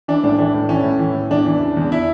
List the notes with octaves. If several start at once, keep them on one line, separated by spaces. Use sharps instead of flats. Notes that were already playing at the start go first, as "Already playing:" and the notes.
E3 D4
A2 D4
E3 D4
A2
E3 C#4
A2
E3
A2
E2 D4
E3
C#3
E2
E4